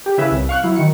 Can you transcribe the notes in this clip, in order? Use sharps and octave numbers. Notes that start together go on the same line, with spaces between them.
G4
C#3 E4 B4 E5
C2
F5 C#6 F#6
F#3 E4
D#3 C#7